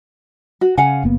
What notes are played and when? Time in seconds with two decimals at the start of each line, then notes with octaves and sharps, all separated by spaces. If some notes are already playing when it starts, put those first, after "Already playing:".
0.61 F#4
0.77 C#3 F5 F#5 G#5
1.04 F#1 A#3 B3